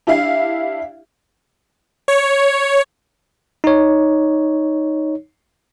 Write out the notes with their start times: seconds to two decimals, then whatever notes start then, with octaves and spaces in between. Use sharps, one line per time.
0.07 D4 E4 G4 E5 F5
2.08 C#5
3.64 D#4 C#5